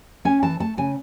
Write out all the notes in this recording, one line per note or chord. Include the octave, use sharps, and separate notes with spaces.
C#4 G#5
E3 A5
A3 A5
C#3 G#5